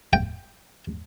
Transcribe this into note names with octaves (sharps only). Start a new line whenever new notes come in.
G5